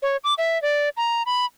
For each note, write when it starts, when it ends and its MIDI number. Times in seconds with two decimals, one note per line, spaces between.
0.02 0.17 73
0.24 0.34 86
0.38 0.60 76
0.62 0.89 74
0.97 1.23 82
1.26 1.45 83